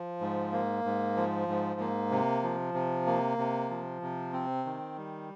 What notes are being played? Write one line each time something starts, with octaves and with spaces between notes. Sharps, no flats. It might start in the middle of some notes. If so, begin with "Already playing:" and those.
Already playing: F3
G#2
A#3
G#2
F3
G#2
A#3
C3
F3
C3
A#3
C3
F3
C3
C4
D#3
G3